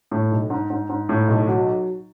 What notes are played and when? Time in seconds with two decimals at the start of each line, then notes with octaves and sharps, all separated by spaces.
0.11 A2
0.32 B1
0.50 G#2
0.70 G#2
0.89 G#2
1.09 A2
1.28 B1
1.48 F#3